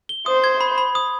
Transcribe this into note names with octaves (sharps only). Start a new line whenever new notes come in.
G7
C5 D#6
G#6
B5
B5
D#6